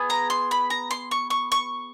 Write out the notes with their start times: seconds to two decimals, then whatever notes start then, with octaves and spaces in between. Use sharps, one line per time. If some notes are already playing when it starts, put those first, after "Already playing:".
Already playing: B3 G#4
0.10 A#5
0.30 C6
0.51 B5
0.70 A#5
0.91 C6
1.11 C#6
1.30 C#6
1.52 C#6